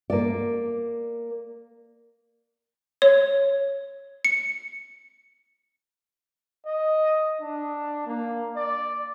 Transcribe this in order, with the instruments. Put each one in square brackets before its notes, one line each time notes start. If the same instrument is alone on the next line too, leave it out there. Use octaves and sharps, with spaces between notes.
[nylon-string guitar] A#3 D5
[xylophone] C#5
C#7
[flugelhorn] D#5
D4
A#3
D5